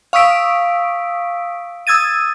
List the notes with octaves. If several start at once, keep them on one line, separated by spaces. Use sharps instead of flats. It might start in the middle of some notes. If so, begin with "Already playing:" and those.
F5 C#6 D#6 E6 B6 D7
D#6 E6 G#6 A6 D#7